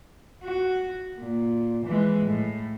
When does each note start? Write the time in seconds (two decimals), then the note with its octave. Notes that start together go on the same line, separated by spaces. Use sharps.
0.44 F#4
1.18 A#2
1.85 E3 G#3
2.25 A2